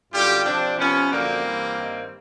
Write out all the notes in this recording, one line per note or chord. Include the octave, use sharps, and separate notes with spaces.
F#2 D3 G3 F4 G4
C3 F3 C4 D4
C3 F3 B3 C#4
F#2 D3 F3 A#3 C4
G2 E3 G3
G2 D#3 G3